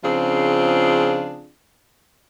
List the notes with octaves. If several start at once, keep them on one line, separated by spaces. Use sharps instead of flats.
C#3 F3 C4 D4 F4 G#4